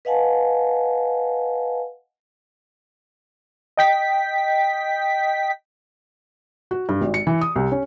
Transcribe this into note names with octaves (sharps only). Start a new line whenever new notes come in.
B4 D#5 F5 F#5 G#5 A5
D#5 G5 B6
F#4
G2
G#1
C#7
E3
D#6
C2
C#4